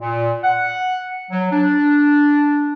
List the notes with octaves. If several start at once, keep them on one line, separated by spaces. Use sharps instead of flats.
A#2
F#5
F#3
D4